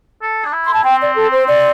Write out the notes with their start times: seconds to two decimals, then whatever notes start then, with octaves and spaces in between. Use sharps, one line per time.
0.22 A4
0.45 D4
0.53 E4
0.64 C6
0.73 A5
0.84 C4 G5
1.01 D5
1.15 A4
1.32 C5
1.47 D5